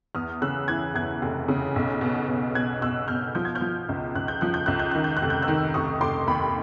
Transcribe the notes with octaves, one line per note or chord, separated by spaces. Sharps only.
E2 D#6 F6
C#3 E6 F#6
E3 F#6 G#6
E2 F#6 G#6
F1
C#3
B1
B2
B2
B2 F#6 G#6
B2 E6 F#6
B2 F6 G6
F3 G6
G#6
F6 G6
F3
C#2
C#2 F#6
G6
F3 F#6
G6
C#2 F#6
G6
D#3 F#6
G6
F#6
F1
G6
E6 F#6
D#3
F1 C#6 D#6
F1 C6 D6
D#2 B5 C#6